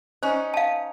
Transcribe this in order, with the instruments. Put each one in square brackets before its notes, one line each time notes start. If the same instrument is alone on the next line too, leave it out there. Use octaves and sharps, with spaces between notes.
[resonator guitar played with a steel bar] C#4 D#4 [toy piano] C5
[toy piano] F5 A5